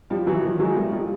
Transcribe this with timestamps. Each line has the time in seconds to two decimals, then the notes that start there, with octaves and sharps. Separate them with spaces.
0.10 F3 G3
0.27 E3 F#3
0.43 D#3 F3
0.59 F#3 G#3
0.76 G3 A3
0.93 F3 G3